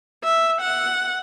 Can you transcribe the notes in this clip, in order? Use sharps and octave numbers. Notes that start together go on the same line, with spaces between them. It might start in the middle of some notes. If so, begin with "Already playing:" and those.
E5
F#5